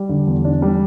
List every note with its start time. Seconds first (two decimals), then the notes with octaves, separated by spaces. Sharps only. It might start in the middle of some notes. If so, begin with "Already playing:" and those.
Already playing: G3
0.09 D3
0.27 E2
0.44 D4
0.62 G3